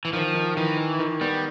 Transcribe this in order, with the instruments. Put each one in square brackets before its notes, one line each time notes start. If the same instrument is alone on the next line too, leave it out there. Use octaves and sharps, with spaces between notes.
[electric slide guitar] E3
[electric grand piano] D#3 [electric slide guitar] F3
[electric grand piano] D#3
[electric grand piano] D#3 [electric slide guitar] E3
[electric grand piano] D#3
D#3
[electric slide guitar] G3 [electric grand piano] B3